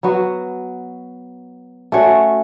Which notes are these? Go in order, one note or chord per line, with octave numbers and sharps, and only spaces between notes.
F#3 B3 F#4
A3 C#4 F#4 C#5